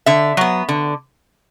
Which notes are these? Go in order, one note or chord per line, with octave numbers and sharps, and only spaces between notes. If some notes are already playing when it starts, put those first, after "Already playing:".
D3 E5
F#3 B3
D3